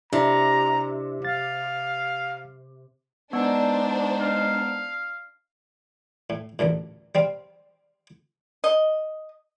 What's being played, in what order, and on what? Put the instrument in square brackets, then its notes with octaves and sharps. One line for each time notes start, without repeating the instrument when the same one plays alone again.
[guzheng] C3 [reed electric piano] D4 E4 [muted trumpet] A#5
[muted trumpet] F5 [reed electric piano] A6
[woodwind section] G#3 D#4 [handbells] B3 [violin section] D4 C5
[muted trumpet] F5
[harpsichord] A2
A1 D2 G2 A#2
G3 C4 F5
[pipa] D#5